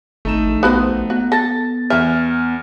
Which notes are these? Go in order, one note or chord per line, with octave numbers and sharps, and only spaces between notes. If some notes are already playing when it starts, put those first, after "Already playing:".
G#1 A3 D#4 E7
A#1
B3 F#4 C5
B3 F#4
A4 A6 A#6
E2 E5 G#5 F6